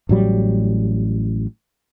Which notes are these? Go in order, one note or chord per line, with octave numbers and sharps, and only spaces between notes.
A1 A2 F#3 G3